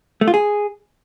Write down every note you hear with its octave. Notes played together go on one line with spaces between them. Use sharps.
A3
F4
G#4